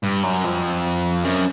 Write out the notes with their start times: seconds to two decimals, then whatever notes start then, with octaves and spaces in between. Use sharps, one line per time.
0.04 G2
0.24 F#2
0.45 F2
1.24 F#2